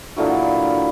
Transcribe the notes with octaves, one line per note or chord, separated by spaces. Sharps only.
A#2 D3 E3 F#3